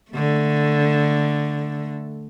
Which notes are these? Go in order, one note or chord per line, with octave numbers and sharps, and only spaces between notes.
D3 A3